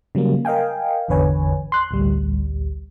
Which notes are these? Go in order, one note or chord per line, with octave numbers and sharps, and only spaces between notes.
C#3 F#3 G3 A#3
A#4 D#5 F5 G5 G#5
G#1 E2 D3 B4 C#5 G#5
C6 F#6
A1 D2 G3